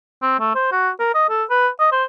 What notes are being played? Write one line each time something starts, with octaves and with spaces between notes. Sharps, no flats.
C4
A3
C5
F#4
A#4
D#5
A4
B4
D#5
C5